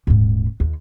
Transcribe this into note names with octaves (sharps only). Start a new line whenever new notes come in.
D#1 G#2
D#2